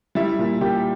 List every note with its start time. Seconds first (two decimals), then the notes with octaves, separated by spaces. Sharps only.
0.15 G3 E4 E5
0.39 A#2
0.61 A#2 G4 G5